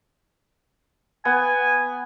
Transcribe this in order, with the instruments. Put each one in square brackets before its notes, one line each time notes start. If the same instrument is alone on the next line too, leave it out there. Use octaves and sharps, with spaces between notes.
[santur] B3 [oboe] G#5